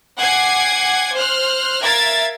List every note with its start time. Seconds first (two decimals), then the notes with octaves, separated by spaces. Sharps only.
0.18 F#5 G#5 D6 G#6 C7
1.15 C5 F6 F#6
1.83 A#4 E5 F5 G#6 A6